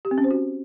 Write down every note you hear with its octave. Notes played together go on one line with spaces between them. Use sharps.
G4
C4
C#4
C5
F#4